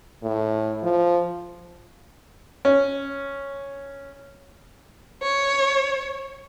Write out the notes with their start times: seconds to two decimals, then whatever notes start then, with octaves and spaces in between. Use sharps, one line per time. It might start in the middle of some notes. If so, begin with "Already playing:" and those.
0.23 A2
0.83 F3
2.65 C#4
5.23 C#5